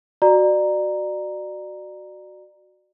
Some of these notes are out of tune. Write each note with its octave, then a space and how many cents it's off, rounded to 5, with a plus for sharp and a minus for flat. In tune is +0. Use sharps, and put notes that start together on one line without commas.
F#4 +0 D5 +25 A#5 +0